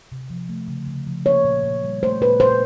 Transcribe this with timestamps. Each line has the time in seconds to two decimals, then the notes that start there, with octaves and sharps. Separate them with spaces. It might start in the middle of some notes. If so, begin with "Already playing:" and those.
0.12 C3
0.30 F3
0.49 A3
0.68 C#3
0.87 C#3
1.07 F3
1.25 A#3 C#5
1.44 A#2
1.63 A#2
1.84 G3
2.03 A3 C5
2.21 A#2 B4
2.40 A#2 C5